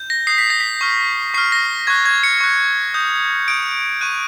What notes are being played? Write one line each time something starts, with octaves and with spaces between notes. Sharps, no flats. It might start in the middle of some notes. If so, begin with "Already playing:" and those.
Already playing: G6
A#6
D#6 G6 C7
B6
A#6
B6
C#6 F6
C#6 F6 C7
A#6
C#6 F#6 G#6
G#6
C#7
C#6 F#6
D#6 G6
D#6 G6 D7
C#6 F#6 D#7